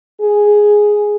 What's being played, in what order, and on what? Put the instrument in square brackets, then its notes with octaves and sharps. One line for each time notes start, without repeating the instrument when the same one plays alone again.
[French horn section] G#4